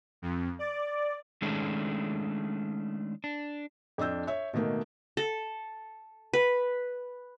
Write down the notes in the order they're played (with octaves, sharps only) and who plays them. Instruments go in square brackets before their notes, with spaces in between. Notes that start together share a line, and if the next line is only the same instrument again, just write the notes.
[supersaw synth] F2
D5
[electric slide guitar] D#3 G#3 A3 C#4 D4
D4
[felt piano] F2 D4 D#5 E6 G6
C#5 E5
B2 D#3 A3 A#3
[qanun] A4
B4